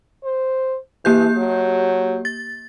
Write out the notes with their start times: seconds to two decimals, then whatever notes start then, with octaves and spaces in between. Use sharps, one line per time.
0.24 C5
1.05 E3 A#3 G4 G6
1.37 F#3
2.25 A6